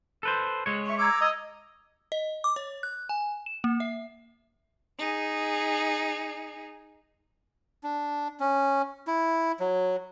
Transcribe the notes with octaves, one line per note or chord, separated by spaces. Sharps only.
A4 B4 C5
G#3 C#5
E5 C#6
A#5 D6 E6 G#6
D#5
D#5
D6
C#5
F#6
G#5
E7
A#3
E5
D#4 G#4
D4
C#4
E4
F#3